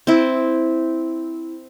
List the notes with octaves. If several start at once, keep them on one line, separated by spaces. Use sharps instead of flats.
C4 E4